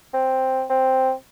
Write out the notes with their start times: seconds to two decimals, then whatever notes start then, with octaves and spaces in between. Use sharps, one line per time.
0.14 C4
0.70 C4